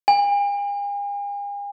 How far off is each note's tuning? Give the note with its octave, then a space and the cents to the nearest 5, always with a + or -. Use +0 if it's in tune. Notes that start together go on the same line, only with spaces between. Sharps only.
G#5 -45